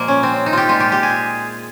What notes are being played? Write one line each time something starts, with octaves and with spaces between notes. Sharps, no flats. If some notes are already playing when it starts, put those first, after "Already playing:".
Already playing: A#2 F3 G#3 A#3
C#4
C4
D#4
F4 G4
A#2 G#3 F4
G4
G4
G#4